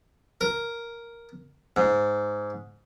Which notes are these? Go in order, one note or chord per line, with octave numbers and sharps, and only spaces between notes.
A#4
G#2